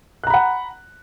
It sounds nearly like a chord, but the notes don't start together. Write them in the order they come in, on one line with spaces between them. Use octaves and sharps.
F#6 A#5 B5 F#5